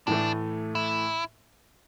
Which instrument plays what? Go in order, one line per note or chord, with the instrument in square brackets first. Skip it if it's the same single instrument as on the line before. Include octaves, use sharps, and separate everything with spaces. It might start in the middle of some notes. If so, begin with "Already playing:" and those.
[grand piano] A2 E3 A3 [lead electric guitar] D4
[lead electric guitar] E4